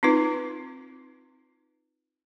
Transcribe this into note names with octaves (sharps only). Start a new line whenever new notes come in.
C4 D#4 F4 B4